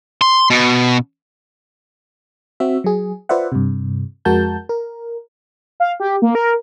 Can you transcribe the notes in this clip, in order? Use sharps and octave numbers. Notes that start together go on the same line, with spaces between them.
C6
B2
C4 F#4 E5
F#3 G#4
F4 B4 C5 D5 E5 F#5
G2 C3
F2 G#3 F#4 A#4 A5 G6
A#4
F5
G4
A#3
A#4